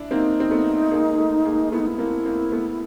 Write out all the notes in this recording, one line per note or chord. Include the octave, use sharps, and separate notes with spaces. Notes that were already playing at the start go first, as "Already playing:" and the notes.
Already playing: D4 E4
A#3 C4 D#4
C4
A3 B3
G#3 A#3
A3
G#3 A#3
A3 B3 E4
D#4
E4
A#3 C4
A#3 C4
A3 B3